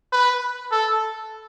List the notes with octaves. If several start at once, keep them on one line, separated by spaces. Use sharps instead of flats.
B4
A4